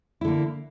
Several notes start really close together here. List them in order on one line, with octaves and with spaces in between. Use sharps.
E4 D3 A#3